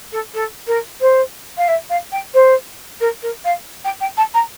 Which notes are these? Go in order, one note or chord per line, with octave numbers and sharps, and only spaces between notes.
A4
A4
A#4
C5
F5
E5
F5
G5
C5
A#4
A#4
F5
G5
G5
A5
A#5